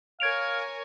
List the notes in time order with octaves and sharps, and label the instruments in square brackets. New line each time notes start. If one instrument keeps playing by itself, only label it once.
[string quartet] A#4 C#5 G#5 [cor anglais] F5 [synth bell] G#6 D7 F7